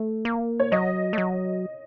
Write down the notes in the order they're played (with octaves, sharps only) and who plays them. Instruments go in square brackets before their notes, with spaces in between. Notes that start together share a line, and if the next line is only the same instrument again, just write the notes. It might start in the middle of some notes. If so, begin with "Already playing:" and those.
Already playing: [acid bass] A3
A#3
[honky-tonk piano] C#5
[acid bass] F#3 [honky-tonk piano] D#5
[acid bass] A3
F#3